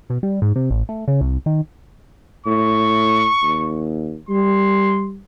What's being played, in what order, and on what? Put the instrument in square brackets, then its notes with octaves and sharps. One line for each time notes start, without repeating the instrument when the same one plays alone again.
[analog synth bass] B2
G3
G#2
C3
A1
A3
C#3
C2
D#3
[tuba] A2 [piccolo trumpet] C#6
[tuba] D#2
[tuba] G3 [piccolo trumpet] C6